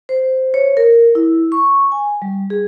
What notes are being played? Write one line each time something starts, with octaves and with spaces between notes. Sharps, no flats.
C5
C#5
A#4
E4
C#6
G#5
G3
G#4